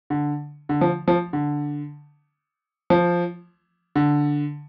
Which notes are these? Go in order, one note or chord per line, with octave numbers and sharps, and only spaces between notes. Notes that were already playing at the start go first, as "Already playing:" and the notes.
D3
D3
F3
F3
D3
F3
D3